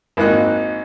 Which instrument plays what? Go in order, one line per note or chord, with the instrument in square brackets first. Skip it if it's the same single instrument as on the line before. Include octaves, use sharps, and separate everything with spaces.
[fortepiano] G#1 A#3 D#4 F#6